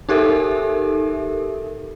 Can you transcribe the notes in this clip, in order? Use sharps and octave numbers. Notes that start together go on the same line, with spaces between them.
D#4 G4 A4 A#4 E5